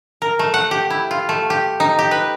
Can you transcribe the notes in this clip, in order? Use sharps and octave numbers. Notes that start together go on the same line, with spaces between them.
A#4
A3
F#5
G4
E4
F4
A3
G4
D#4
G4
B4